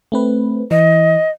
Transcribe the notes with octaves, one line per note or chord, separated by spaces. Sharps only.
A3 C4 B4
E3 D#5